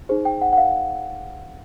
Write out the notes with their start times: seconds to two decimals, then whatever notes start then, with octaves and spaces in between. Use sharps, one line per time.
0.09 D#4 G#4 C5
0.25 G5
0.42 F#5
0.53 F#5
0.58 F5